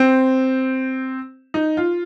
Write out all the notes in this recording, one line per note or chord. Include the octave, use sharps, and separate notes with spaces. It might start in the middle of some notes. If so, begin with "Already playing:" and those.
Already playing: C4
D#4
F4